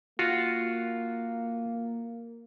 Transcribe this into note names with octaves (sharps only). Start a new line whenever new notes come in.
A#3 F4 F#4